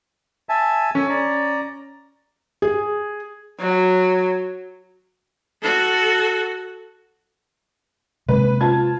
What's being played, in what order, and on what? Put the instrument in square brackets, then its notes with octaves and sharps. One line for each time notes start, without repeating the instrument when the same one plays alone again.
[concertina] E5 G#5 A5
[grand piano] C#4 [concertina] A4 G#5
[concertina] D5 A#5
[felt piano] G#4
[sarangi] F#3
[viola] F#4 A4
[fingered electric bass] C3 G#3 A#3 [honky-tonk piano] B4
[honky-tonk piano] F4 A5 G#6